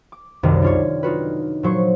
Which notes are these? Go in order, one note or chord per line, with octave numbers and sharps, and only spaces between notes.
D6
C2 F#2 C3 D#3
D4 F4 C#5
D#4 F4 F#4 B4
A#2 F#3 C5 C#6